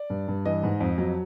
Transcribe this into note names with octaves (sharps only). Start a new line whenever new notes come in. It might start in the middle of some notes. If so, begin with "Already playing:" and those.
Already playing: D5
G2
G2
E3 D#5
G#2
F2
F#3